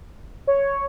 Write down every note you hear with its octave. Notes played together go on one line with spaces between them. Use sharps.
C#5